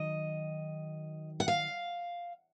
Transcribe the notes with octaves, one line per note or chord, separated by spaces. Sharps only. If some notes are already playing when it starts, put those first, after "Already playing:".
Already playing: D#3 F#3 D#5
F#5
F5